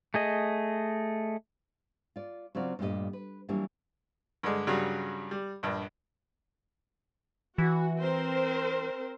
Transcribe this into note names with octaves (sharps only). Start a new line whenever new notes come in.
A3 G#4 D#5
F4 D5
C#3 F#3 C4 F4 D5
G2 A#2 A3 B3 G4 D#5
B4
E3 F#3 G3 A#3 D4
G2 D3 G#3
G2 C#3 F#3 G3
G3
A#1 G2
E3 F#4
C4 A#4 C5